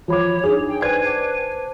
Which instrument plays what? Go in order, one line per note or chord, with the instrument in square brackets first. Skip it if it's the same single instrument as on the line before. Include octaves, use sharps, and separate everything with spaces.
[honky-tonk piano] F3 B5 D6 [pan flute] C#5
[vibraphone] D4 D#4 [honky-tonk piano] G#4
[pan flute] G5
[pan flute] B4 [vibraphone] C5 G5 G#5 [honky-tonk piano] D5 G#6
[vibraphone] C5 A5 D6